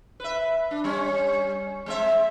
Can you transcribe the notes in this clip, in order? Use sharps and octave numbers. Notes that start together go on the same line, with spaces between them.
B4 E5
D4
G3 C#4
G#3 C4 E5